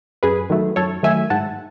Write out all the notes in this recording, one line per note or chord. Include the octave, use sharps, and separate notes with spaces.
F#2 G#4 B4
D#3 F#3 A3
F#2 A4 C#5
D#3 F#3 A3 E5 G#5
G#2 F#5 A5